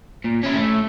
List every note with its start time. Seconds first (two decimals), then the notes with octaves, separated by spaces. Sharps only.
0.25 A#2
0.44 C#4 E4
0.56 A3